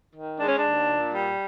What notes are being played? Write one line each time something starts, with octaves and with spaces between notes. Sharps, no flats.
D#3
G#3 D4
C#4
D4
D#2
A#2
G3